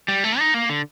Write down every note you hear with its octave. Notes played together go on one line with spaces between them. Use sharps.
G3
A3
D#4
A#3
D3